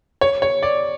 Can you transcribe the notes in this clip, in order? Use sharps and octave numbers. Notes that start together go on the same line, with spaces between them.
C#5
C#5
D5